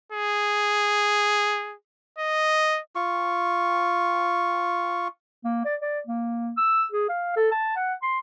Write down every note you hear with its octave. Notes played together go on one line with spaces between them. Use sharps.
G#4
D#5
F4 C#6
A#3
D5
D5
A#3
E6
G#4
F5
A4
A5
F#5
C6